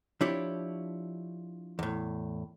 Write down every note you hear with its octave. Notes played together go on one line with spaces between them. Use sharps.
F3 D4 E4 G4 C#5
E2 A2